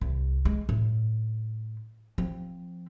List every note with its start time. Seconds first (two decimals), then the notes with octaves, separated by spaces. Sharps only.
0.01 C2
0.45 G#3
0.69 A2
2.18 F3 C4